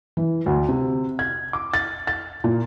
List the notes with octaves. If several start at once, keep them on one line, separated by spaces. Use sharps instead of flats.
E3
D2
C3
G#6
D6
A6
A6
A#2